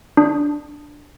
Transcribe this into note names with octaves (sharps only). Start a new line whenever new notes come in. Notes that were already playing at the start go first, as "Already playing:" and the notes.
D4